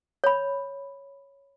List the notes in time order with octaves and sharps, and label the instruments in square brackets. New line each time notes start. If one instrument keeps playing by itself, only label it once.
[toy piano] C#5 B5